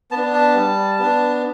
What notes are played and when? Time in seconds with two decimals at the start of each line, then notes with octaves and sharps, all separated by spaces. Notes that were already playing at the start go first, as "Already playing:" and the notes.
0.11 B3 A5
0.16 D4
0.34 A5
0.55 G3
0.99 B3 D4